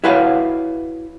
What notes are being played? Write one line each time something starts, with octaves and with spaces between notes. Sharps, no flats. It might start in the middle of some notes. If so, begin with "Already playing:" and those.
E4 F#4 B4 C#5 F5